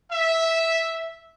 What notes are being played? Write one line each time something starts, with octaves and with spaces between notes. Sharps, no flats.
E5